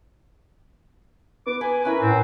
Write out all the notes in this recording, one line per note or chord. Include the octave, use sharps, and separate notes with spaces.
B3 D6
B4 G#5
C#4 E4 A#4 B4
A2 C4